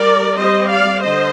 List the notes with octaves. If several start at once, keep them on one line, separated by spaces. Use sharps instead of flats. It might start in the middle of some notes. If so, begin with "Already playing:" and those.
Already playing: G3 A#4 D5
G3 C4 C5 D#5
D5 F5
D3 C5 D#5